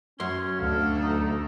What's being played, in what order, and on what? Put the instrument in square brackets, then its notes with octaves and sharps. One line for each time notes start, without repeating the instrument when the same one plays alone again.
[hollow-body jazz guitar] F#2 C6 [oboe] C#4
[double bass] D2 A3 [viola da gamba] D4 A4 [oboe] F5
[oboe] D#4